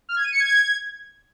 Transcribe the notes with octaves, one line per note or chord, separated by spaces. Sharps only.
F6
G#6
D#7
C#7
G#6